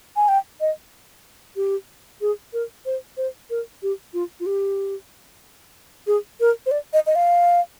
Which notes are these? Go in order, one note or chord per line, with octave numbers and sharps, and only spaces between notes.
G#5
G5
D#5
G4
G#4
A#4
C5
C5
A#4
G4
F4
F4
G4
G#4
A#4
C5
D5
D#5
D#5
F5